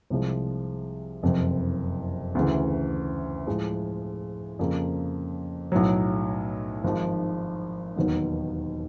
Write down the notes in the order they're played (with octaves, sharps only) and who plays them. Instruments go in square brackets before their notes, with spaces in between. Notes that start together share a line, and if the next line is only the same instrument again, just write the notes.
[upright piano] C2 C3 F3 G#3
F#1 F2 C3
D2 C#3 E3
A2 F3 G#3
F2 C#3 F3 A#3
B1 A2 F#3
G#1 G#2 F3
E1 D#2 D#3 F#3 B3